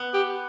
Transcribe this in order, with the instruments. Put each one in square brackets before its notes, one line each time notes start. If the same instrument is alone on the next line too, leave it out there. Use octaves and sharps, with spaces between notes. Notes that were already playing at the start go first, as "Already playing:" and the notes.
Already playing: [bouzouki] B3
[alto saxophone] G4